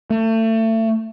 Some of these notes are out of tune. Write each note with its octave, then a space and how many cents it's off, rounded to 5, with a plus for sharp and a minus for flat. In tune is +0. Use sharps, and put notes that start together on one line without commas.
A3 +30